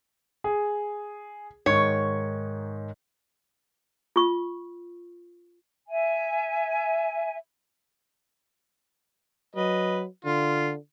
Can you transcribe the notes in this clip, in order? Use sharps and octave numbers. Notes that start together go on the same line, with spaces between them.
G#4
G#2 D#3 C#5
F4 C#6
E5 G#5
F#3 B4 D#5
D3 F4